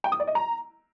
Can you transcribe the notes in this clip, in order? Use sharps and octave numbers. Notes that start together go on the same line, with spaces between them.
G5
D#6
D5
D#5
A#5